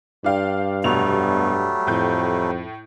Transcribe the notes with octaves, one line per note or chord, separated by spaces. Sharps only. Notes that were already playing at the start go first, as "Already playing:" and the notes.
G2 D4 F5 G5
F1 B2 F#3 G3 A3 F7
F2 A2 G6